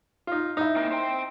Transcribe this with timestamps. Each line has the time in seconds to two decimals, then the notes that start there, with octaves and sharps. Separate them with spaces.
0.27 D#4 F4
0.57 D#4 E4
0.76 A#3 C4 A#4
0.92 C5 G5